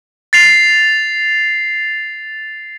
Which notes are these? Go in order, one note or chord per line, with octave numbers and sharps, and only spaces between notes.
A6 C7 F7